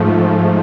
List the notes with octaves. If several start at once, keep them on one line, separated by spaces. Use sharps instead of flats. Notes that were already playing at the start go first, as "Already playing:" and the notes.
Already playing: G#2 F3 A3